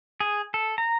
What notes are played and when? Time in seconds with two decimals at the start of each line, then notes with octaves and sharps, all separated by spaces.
0.20 G#4
0.54 A4
0.78 A#5